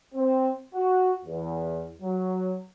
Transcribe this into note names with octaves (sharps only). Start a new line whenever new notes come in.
C4
F#4
E2
F#3